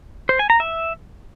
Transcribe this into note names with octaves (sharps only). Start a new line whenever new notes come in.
C5
G#5
A#5
E5